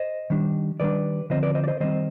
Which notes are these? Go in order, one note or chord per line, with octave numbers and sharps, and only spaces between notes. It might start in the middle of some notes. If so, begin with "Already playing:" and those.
Already playing: C5 D#5
D#3 G3 D4
D#3 G3 D4 B4 D5
D3 F3 C4 C5 D#5
B4 D5
C5 D#5
D5
C5 D#5
D#3 G3 C4 C5 D#5